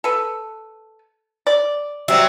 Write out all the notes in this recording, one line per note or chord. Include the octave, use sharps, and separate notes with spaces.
A4 B4
D5
F#3 G3 C4 E4